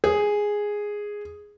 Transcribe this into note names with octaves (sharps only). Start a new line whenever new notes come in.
G#4